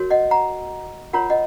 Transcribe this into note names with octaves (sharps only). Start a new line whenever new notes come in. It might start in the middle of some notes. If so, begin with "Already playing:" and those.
Already playing: F#4 A#4 C#5
D#5 F#5
F#5 A#5
F4 A#4 C#5 F#5 A#5
D#5 F#5